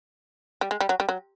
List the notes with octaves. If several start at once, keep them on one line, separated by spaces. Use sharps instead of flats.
G3
G#3
G3
F#3
G3
F#3